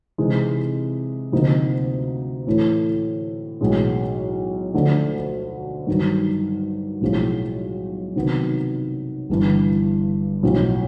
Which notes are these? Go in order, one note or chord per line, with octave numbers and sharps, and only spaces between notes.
C3 E3 G#3 C4 D#4
D2 C3 F3 A#3 D#4
A2 E3 A3
B1 A2 E3 G#3
D2 D3 F3 A3 D4
G2 D#3 F#3
B1 A2 F3 G#3
C3 D#3 F#3 B3
G1 G2 E3
B1 A2 F3